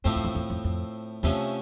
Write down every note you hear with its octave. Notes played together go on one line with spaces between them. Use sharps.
F2 A2 F3 A3 C4
E2
F2
E2
F2
F2
E2 C3 F3 A3 C#4